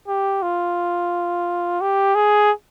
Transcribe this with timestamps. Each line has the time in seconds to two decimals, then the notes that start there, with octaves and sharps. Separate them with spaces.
0.08 G4
0.42 F4
1.81 G4
2.15 G#4